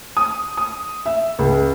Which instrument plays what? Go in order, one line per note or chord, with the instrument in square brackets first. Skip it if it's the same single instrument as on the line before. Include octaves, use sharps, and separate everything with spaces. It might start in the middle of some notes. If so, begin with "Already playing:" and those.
[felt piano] D#6
D#6
E5
C#2